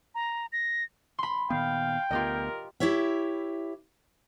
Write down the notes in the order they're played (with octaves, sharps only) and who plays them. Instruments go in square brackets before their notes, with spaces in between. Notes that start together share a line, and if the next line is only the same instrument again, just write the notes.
[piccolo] A#5
A#6
[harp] B5 C6
[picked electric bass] A#2 D#3 B3 [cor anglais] F5 [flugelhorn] G5
[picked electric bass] D2 B3 [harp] F4 G4 D#5 [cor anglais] A#4
[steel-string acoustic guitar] E4 G4 C#5 E5